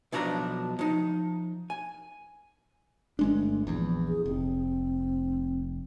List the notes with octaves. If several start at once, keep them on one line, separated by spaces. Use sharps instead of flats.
B1 B2 F3 D4 F#4 A#5
F3 D#4
G#5
G1 G#3 C#4 D4
A3
A#1 E2 F3
G#4
F1 C4